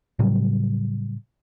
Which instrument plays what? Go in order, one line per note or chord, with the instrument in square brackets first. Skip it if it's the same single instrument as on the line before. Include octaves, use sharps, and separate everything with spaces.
[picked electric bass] A2 C#3 F#3 G3